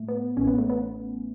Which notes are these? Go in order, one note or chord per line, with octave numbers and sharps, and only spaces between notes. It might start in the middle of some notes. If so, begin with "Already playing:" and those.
Already playing: A2 A3
B3
A1 A2 E3 C#4
B3
A3
B3